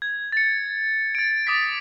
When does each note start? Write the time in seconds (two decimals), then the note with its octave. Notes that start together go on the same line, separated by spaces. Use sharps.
0.02 G#6
0.32 A6 C#7
1.15 A6 D7
1.47 D6 D#6 A6 B6